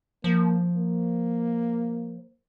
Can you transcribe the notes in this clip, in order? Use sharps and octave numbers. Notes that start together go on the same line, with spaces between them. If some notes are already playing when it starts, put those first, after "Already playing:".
F3 A#3
A#3